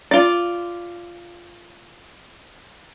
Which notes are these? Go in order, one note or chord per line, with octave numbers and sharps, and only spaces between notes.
F4 D5